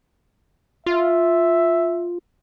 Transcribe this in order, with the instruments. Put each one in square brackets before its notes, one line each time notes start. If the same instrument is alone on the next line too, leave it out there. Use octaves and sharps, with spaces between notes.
[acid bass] F4 [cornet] E5